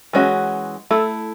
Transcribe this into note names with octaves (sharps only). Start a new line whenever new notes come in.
E3 G#3 C#4 F#4
A3 E4 A4